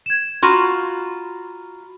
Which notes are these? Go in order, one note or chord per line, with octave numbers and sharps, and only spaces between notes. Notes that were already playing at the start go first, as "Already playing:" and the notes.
G#6 E7
F4 F#4 A#5 B5 F6